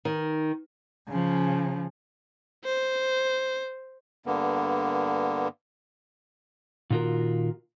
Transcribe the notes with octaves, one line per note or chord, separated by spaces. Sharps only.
D#3
C#3 F3
C5
G2 D3 A#3 B3
A#2 D#3 F4 F#4 A#4